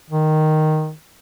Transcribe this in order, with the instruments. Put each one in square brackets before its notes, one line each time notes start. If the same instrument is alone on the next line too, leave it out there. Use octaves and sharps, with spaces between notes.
[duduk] D#3